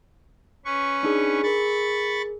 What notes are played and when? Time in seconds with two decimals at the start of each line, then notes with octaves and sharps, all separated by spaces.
0.65 C#4 B4 C#6
1.03 D4 D#4 G#4
1.43 G#4 A#4 B5 C#6 A6